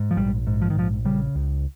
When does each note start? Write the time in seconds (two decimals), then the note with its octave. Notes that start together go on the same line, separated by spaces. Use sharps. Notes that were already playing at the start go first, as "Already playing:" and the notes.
Already playing: G#2
0.11 F3
0.16 A#1 G3
0.47 G#2
0.62 F3
0.70 D#3
0.76 A#1 F3
1.05 C#3 G3
1.35 C#2